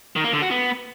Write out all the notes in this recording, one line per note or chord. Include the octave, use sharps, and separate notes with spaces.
D#3
A#3
D3
F#4
B3